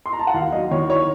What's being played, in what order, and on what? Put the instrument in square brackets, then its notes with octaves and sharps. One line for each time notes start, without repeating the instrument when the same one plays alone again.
[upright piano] C6
A#5
A5
F#5
D#2 F5
F#3 D#5
D#3 C#5
C#5